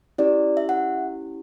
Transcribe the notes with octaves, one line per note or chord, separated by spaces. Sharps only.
C#4 E4 G4 D5
E5
F#5